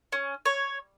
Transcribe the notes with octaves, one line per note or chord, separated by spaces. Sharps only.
C#4
C#5